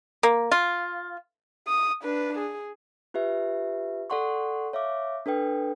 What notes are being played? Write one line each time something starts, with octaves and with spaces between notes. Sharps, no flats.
A#3
F4
D#6
D4 B4
G#4
F4 G4 B4 E5
A4 D5 F#5 C6 C#6
C#5 E5 F5 D6
D4 A4 B4 G5